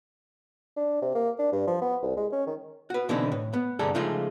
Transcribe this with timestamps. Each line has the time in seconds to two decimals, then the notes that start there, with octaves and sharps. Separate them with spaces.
0.77 D4
1.02 C3
1.15 A#3
1.39 D4
1.52 G2
1.67 F3
1.82 B3
2.03 C2
2.17 G#3
2.32 C#4
2.47 D#3
2.90 F#4 B4
3.09 B2 D3 E3 C4 D#4 E4
3.32 A2
3.53 B3
3.79 C2 G2 D3 G#4 A4 A#5
3.95 C#3 F3 G#3 A3 D#4 F4